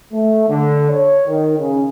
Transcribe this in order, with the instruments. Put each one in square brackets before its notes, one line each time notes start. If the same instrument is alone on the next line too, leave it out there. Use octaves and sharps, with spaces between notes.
[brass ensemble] A3
D3
C#5
D#3
C#3